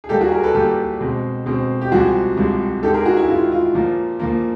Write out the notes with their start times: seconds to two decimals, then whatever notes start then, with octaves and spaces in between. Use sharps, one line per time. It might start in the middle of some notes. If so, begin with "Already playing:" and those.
0.04 G#4
0.09 A#2 G3 A#3 G4 A4
0.21 F#4 G#4
0.32 G#4 A#4
0.44 A4 B4
0.55 A#2 G3 A#3 G4 A4
1.01 B2 G#3 C4
1.46 B2 G#3 C4
1.81 G4
1.92 C2 C3 F3 G#3 F#4 G#4
2.37 C2 C3 F3 G#3
2.83 G#2 D#3 G#3 G4 A4
2.94 G#4 A#4
3.05 F#4 G#4
3.17 E4
3.28 G#2 D#3 G#3 F4
3.52 F4
3.74 A#2 F3 A#3
4.20 A#2 F3 A#3